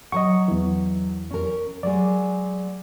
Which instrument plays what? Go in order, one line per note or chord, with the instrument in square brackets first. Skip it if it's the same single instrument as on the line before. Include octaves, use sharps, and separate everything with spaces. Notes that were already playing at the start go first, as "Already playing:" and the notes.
[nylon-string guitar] F#3 F#5 [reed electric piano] D#5 C#6
[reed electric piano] E2 E3
[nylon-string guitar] C#4 A#4
[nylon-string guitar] F#3 G#3 [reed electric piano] D5